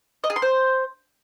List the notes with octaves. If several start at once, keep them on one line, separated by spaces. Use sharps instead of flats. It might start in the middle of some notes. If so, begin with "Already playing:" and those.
D#5
G#4
C6
C5